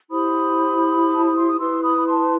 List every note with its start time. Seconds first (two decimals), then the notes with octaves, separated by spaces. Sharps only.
0.11 E4 G4 C5 B5 D#6
1.15 A5
1.26 B5
1.37 C6
1.48 D#6
1.59 E4 B4 C6 E6
1.83 B5 D#6
1.97 B5
2.08 A5 C6